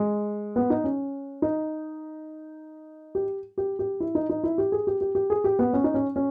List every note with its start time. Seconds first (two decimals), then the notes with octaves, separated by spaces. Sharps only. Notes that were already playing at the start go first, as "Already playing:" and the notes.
Already playing: G#3
0.56 B3
0.70 D#4
0.84 C#4
1.42 D#4
3.15 G4
3.58 G4
3.79 G4
4.00 E4
4.15 D#4
4.30 D#4
4.44 E4
4.58 G4
4.72 G#4
4.87 G4
5.01 G4
5.15 G4
5.30 G#4
5.44 G4
5.59 B3
5.73 C#4
5.84 D#4
5.94 C#4
6.16 C#4